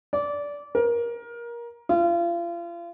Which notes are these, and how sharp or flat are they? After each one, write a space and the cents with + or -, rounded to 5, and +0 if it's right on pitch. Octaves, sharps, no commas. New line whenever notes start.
D5 -20
A#4 +20
F4 -35